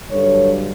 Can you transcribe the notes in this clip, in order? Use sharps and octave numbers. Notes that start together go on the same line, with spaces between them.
G2 D3 F#3 A4 C#5